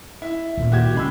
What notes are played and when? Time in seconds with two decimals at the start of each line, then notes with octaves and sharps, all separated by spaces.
0.22 E4
0.57 D#1 A#2
0.72 F#4 G4 G#6
0.95 C#3 G#3 B5 E6